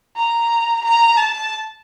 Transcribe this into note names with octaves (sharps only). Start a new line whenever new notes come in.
A#5
A#5
A5